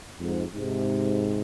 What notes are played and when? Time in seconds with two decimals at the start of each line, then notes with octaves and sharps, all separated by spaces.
0.19 F2 G#2
0.54 G#2 C3